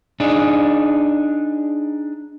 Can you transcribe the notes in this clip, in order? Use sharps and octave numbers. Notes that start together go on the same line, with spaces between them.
D4 D#4 G#4